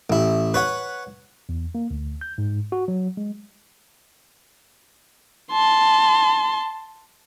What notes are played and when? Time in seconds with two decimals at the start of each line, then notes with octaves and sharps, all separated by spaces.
0.10 A1 E4
0.54 B4 C#5 F#5
1.49 E2
1.75 A#3
1.91 D2
2.21 G6
2.38 G#2
2.72 F#4
2.88 F#3
3.17 G#3
5.51 A5 C6